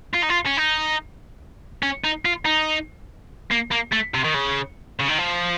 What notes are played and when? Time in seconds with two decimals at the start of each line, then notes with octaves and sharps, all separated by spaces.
0.14 F4
0.23 D#4
0.30 F4
0.46 C#4
0.58 D#4
1.83 C#4
2.04 D#4
2.25 F4
2.45 D#4
3.51 A#3
3.71 A#3
3.92 A3
4.14 C3
4.24 D#3
4.34 C#3
4.99 C#3
5.08 D#3
5.18 F3